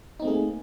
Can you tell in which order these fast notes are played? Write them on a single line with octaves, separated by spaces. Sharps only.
D#4 C4 A3 G#4 A#3